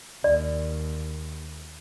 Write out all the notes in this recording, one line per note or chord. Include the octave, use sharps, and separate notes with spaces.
D#2 D5